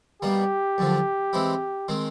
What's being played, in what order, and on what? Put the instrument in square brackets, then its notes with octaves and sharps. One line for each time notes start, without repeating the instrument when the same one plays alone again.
[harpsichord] B2 G3 A#3 [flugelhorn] G4
[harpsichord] F#2 D3 F3
E3 G#3 C4 E4
D#3 G#3 C4